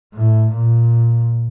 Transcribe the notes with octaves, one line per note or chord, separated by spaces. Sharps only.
A2
A#2